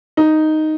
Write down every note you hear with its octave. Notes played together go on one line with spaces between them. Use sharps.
D#4